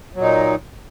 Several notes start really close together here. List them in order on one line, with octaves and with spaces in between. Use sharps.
F#3 A#2 D#4